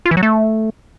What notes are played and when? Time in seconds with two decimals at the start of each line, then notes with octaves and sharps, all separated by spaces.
0.06 F4
0.11 E3
0.17 F#3
0.23 A3